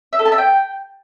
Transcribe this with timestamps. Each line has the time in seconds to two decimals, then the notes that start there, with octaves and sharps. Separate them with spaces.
0.13 E5
0.19 A4
0.25 A5
0.32 E5
0.38 G5